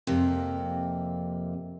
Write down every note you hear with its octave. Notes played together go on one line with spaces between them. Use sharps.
F2 C3 A#3